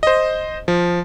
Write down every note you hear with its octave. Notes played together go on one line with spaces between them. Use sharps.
C5 D#5
F3